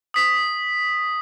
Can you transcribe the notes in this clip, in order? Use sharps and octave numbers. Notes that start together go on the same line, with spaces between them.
D#6 B6